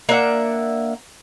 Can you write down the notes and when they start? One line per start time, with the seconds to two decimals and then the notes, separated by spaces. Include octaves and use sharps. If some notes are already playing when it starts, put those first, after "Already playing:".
0.09 A#3 D4 E5 F#5